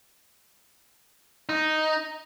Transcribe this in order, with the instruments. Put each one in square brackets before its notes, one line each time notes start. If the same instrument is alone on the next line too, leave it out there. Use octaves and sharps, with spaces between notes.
[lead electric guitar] D#4